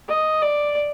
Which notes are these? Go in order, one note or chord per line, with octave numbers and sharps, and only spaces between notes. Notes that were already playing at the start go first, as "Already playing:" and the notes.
D#5
D5